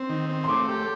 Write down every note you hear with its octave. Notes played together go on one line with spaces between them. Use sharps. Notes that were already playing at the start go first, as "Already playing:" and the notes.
Already playing: C4
D#3
C4
C6
A3 D6
G4